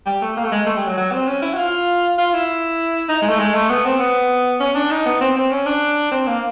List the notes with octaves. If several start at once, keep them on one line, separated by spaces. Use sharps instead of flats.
G3
A3
A#3
A3
G#3
A3
G3
F#3
F#3
C4
C#4
E4
F#4
F4
F4
E4
D#4
G#3
A3
G#3
A3
B3
C4
B3
C#4
D4
D#4
B3
C4
C4
C#4
D4
C4
A#3